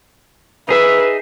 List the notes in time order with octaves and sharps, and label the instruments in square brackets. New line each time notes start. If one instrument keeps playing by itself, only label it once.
[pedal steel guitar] D#4 G#4 E5 [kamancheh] B4